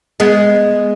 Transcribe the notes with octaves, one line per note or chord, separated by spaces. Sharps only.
G#3 B3